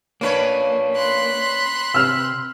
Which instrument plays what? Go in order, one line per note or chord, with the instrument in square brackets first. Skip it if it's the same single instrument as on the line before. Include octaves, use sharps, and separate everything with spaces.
[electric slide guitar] A#3 D4 [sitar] C#4 B4 C#5
[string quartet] B5 C6 F#6
[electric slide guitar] C3 [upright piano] E6 F6